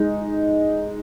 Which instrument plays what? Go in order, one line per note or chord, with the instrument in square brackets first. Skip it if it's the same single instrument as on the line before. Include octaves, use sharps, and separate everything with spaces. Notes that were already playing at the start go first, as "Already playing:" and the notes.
Already playing: [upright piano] G#3 D#4